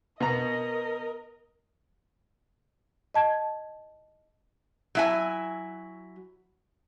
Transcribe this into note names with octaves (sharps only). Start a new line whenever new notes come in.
B2 A#4 D#5 A#5
D#5 A5 G#6
F#3 E4 G#5